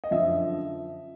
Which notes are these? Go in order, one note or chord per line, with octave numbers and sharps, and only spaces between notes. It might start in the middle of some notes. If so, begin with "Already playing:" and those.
D#5
F#2 D3 F3 E5